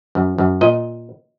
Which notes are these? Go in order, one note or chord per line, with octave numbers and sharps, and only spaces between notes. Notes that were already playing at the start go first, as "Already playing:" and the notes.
F#2
F#2
A#2 D#5